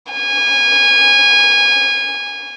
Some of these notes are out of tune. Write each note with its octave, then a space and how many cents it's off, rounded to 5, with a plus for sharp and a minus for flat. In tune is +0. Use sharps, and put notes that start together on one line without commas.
G#5 -20